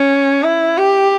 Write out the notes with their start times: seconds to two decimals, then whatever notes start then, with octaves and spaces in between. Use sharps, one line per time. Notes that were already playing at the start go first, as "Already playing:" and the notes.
Already playing: C#4
0.43 E4
0.78 G4